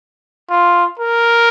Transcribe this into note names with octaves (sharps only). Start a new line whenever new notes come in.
F4
A#4